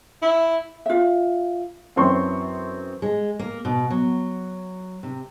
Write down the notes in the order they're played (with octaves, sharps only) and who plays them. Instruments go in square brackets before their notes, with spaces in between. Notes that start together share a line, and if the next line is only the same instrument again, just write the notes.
[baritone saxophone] E4
[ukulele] F4 E5
[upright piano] F#2 E3 F#3 C4 C6 C#6
[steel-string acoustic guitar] G#3
A#3
B2
F#3
C3